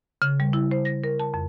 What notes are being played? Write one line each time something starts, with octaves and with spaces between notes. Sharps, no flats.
C#3
G3
E4
C5
A#6
A#4
A5
F2